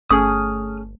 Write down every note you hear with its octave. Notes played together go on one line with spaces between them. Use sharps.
G1 A3 C#4 G#4 D#6 F6